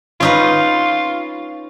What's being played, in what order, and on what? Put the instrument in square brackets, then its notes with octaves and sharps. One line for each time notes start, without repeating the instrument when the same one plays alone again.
[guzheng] C#4 D#4 B4 [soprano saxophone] F4